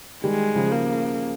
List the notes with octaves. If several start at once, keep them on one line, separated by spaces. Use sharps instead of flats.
D#3 G3 G#3
C#3 F3
A#3